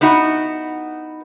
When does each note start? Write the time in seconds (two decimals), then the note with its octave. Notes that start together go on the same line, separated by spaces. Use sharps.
0.01 B3 D#4 E4 F#4